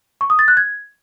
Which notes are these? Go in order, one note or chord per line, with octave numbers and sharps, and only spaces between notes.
C#6
D#6
A6
F#6
G#6